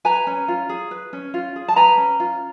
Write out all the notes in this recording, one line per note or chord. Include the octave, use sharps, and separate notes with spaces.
B4 G#5 A#5
C#4
F4
G#4
B4
C#4
F4
G#4
A5
B4 G#5 A#5
C#4
F4